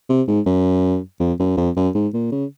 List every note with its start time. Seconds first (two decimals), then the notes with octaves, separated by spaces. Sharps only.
0.09 C3
0.27 G#2
0.46 F#2
1.20 F2
1.40 F#2
1.57 F2
1.76 F#2
1.95 G#2
2.14 A#2
2.32 C#3